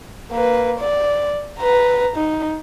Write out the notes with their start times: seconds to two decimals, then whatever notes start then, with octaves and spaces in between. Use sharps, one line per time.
0.32 A#3 B4
0.80 D5
1.59 B4 A#5
2.16 D#4